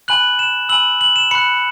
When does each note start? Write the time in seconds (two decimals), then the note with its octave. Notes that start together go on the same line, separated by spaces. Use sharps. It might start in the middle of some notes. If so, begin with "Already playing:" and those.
0.08 G#5 B5 F#6 F#7
0.39 E7
0.69 G#5 B5 E6 F#7
1.01 F#7
1.16 E7
1.31 B5 F#6 C#7